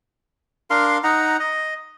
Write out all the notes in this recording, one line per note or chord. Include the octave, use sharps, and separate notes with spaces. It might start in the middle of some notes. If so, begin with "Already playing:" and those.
D4 A#4 F5 C6
D#4 F#5 A#5
D#5